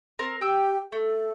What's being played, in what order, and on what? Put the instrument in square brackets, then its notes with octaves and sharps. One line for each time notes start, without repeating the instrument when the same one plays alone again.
[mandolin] C4 A#4
[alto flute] G4 [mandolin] G5 E6
[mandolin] A3 [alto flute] A4